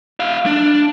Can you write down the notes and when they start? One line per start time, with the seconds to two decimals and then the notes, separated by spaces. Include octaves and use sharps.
0.20 E4 F5
0.46 D4